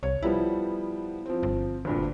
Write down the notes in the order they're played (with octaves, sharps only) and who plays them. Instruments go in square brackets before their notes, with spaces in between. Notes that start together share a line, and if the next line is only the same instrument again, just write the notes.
[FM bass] C2 [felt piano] C#5
[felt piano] F3 G3 B3 [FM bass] E4
[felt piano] F3 C4
[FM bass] G1
[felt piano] D2 G2 A#2